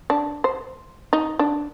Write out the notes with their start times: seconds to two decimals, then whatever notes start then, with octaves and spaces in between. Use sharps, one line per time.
0.10 D4
0.44 C5
1.13 D#4
1.39 D4